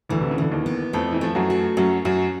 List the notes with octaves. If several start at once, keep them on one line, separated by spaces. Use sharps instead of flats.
D2 D3 E3
C3
C#3
D3 E3
D#2 D#3
B3
F2 F3 A3
E3
F3 A3
F#2 F#3
F#4
F#2 F#3 C#4
F#2 F#3 F#4